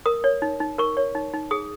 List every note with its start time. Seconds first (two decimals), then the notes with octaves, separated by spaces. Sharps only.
0.06 A#4 D#6
0.24 C#5
0.42 D#4
0.60 D#4
0.78 A#4 C#6
0.97 C#5
1.15 D#4
1.34 D#4
1.51 G#4 D#6